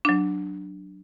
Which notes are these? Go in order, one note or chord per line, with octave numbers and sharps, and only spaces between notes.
F#3 D4